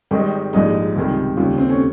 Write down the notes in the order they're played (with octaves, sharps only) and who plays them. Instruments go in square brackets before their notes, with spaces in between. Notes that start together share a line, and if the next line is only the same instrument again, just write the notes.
[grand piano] G#1 G#2 D#3 G3 D#4
A#1 G#2 G3 D#4
C#2 C3 D#3 G3
D#2 C#3 G3 F4
C4
C#4